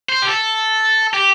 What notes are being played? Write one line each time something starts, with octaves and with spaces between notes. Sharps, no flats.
C5
G4
A4
G4